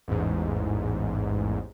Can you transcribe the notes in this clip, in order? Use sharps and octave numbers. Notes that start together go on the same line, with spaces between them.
A1 E2 G#2